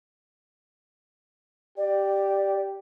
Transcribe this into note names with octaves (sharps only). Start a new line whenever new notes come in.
G4 D5